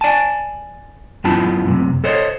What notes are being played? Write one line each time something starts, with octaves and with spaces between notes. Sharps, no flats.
D5 G#5 A5
F#2 B3 C#4 E4 F4 A5
F#2 A2 C3
A4 C5 C#5 D#5